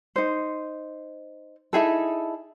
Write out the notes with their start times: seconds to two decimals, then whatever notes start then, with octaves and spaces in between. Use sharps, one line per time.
0.16 D#4 C5
1.73 D#4 E4 G#4 A4